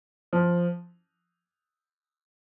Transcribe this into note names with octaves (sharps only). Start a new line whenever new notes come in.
F3